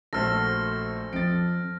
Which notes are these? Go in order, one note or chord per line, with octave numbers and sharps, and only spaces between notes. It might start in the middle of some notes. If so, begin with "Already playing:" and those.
A#1 A3 F#4 A4 C5 F6 A#6
F2 A6 D7